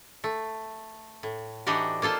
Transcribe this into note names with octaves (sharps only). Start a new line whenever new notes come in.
A3
A2
E3 D4 D#4 F#4 G4
A#3 F4 A4 C5